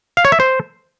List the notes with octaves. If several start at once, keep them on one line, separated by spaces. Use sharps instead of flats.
F5
C#5
E5
C5